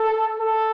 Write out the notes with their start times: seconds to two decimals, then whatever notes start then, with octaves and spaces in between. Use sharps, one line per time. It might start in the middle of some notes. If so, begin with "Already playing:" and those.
Already playing: A4
0.39 A4